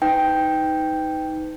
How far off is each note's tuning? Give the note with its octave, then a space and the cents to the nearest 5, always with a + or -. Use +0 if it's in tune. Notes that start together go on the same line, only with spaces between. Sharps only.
D#4 +15 B4 +35 G5 +0